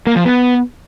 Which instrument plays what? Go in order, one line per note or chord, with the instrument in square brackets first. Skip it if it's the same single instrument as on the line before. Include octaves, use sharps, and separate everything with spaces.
[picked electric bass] A#3
F3
B3